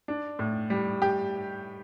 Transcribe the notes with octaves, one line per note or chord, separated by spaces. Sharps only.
D4
A2
G3
G4